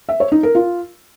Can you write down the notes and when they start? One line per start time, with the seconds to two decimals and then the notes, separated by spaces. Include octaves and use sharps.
0.09 E5
0.20 C#5
0.32 D#4
0.43 A#4
0.55 F4